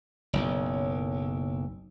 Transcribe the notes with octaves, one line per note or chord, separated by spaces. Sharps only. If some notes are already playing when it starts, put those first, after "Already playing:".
F#1 B1